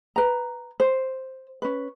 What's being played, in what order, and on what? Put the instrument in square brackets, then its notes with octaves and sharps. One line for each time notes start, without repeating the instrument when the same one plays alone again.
[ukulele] B4 A#5
C5
C#4 B4